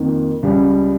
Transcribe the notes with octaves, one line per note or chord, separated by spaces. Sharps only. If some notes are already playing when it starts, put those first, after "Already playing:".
Already playing: F2 D#3 A#3
C#2 C#3 G3